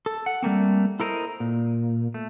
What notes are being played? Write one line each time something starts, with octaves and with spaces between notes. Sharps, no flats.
A4
F#5
G3 A3 A#3 C4
E4 A4 A#4 C5 D#5
A#2
A3